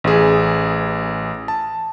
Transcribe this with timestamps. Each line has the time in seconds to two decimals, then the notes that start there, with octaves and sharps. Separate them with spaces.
0.04 A1 G#4
1.48 A5